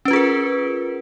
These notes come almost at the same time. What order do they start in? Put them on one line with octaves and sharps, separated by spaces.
C#4 B4 F4 G#4 A#4